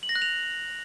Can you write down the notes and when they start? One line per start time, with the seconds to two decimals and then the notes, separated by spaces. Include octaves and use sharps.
0.03 F#7
0.09 A#6
0.15 F#6
0.22 F7